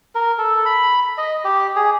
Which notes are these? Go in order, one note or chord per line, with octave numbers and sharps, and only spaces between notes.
A#4
A4
B5
D#5
G4
G#4